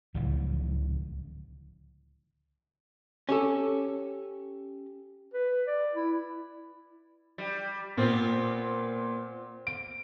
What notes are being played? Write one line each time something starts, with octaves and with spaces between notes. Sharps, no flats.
D1 C#2 E3 F3
C#4 G4 A4
B4
D5
E4
G3
A#2 B3 C4 F4
D7